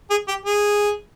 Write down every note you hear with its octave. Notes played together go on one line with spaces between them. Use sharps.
G#4
G4
G#4